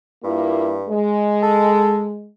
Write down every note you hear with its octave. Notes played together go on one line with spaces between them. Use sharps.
G2 A#3 E4 F4
G#3
A4